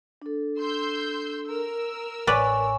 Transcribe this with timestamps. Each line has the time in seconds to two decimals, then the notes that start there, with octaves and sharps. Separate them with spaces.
0.22 D4 A4
0.59 C6 E6 G6
1.48 A#4 E6
2.27 A1 B4 C#5 D5 G#5 C#6